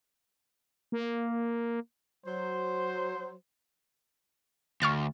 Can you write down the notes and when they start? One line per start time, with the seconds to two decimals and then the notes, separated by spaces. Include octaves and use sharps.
0.92 A#3
2.26 F#3 C5
4.82 D2 C#6 F6 A6